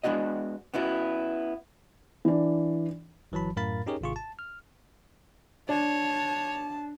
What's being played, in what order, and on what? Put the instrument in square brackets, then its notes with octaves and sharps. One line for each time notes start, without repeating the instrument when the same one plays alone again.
[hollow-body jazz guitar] G#3 B3 D4 F#4 D#5
B3 C#4 E4 F#4
[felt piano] E3 D4
[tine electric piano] G1 E3 F#3 A5 B5
F#2 A2 A#4 F5 B5 A6
C#4 D#4 G4 G#4 A#4 C#5
G#1 G#2 C3 F4 G#4 C#6
A5
F6
[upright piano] D4 [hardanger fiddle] C#5 [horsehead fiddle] A5